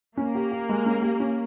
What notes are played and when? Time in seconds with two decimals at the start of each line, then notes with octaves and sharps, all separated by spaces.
0.17 A#3 C#4
0.35 G4
0.51 G4
0.69 G#3
0.86 C#4
1.02 G4
1.20 C#4